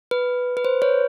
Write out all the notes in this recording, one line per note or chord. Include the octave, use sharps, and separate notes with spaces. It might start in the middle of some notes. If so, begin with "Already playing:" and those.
B4
B4
C5
B4 C#5